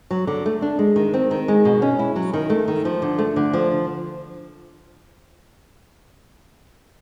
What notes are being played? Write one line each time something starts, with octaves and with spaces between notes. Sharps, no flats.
F#3
D3
A3
D4
G#3
D#3
C4
D#3
G#3
B2
C#4
E4
F#3
D#3
A3
D#3
F3
D3
A3
D3
F3